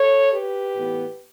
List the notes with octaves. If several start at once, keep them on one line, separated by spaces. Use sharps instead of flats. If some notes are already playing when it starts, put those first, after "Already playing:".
Already playing: A4 C#5
G4 B4
A2 E3 B3